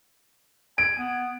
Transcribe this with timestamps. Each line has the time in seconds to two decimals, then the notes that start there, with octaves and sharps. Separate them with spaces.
0.78 G#5 D7
0.98 B3